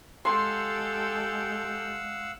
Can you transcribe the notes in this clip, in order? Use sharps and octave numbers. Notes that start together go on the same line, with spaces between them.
G#3 G4 A4 F5 F#5 C6 E6